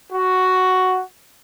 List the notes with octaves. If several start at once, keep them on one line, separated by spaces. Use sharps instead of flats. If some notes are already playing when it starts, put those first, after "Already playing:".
F#4